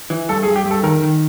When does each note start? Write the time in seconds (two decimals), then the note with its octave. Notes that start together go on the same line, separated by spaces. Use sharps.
0.10 E3
0.29 G2 A4
0.43 G#4
0.48 G2
0.56 G4
0.66 G2 A4
0.83 D#3 A#4
1.02 D#3